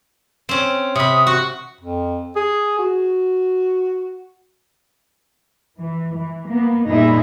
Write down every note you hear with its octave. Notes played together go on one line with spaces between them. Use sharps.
C4 C#4
C3 B5 D#6
F#4 C#6
F2
G#4
F#4
E3
E3
A#3 B3
A#2 G3 D#4 E4 G#4 E5